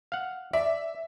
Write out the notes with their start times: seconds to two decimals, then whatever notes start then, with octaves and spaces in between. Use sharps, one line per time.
0.12 F5 F#5
0.53 D5 E5